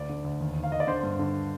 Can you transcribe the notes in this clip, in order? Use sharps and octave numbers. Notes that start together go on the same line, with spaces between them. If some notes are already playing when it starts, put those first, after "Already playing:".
Already playing: D2 D5
D3
D2
D#2
D#3
F5
D#2 D#5
D5
D3 C5
G2
D3